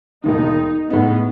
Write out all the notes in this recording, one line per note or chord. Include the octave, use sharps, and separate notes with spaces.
E1 D#2 D#3 D#4
A2 G#3 B3 D#4